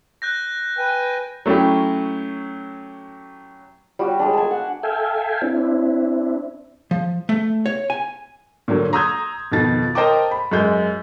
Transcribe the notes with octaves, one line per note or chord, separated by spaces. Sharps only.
F#6 G6 A#6
B4 G5 G#5
F#3 A3 C#4 E4 G4
G3 F#4
G#3 D4
G#5 A5
F#5
A4 E5 F5 G5 G#5
C4 D4 E4
F3
A3
C#5
G#5
A#2 D3 F#3 A#3
A#5 C6 D#6 E6 G6 G#6
F2 B2 D#3 F3 A6
A#4 C5 D#5 G5 A5 D6
B5
F#2 G#3 G6